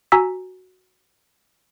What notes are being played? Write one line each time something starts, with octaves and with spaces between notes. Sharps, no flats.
F#4 G#5 A#5 E6 B6